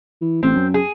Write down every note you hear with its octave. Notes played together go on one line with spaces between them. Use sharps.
E3
A1 C4
F#2
G#4